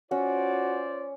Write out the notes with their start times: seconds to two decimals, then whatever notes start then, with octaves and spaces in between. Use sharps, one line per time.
0.11 C#4 F4 F#4 C5 D5